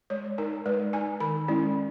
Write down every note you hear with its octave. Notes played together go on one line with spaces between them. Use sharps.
G#3 C#5
D#4 A#4
G#3 B4
D#4 G#5
D#3 B5
G#3 C#4 E4